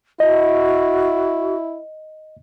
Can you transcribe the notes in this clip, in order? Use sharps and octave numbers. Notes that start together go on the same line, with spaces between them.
E4 F#4 D#5